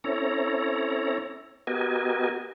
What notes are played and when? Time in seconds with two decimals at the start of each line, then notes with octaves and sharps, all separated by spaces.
0.04 C4 C#4 E4 A4 C#5 A#5
1.67 B3 F#4 G4 A#4 D#5 G#5